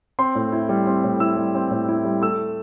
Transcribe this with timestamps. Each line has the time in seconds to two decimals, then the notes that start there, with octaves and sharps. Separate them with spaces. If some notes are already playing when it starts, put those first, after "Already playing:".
0.19 C4 C6
0.35 A2
0.52 E4
0.69 G3
0.87 C4
1.04 A2
1.20 E4 E6
1.37 G3
1.55 C4
1.71 A2
1.88 E4
2.05 G3
2.21 A3 E6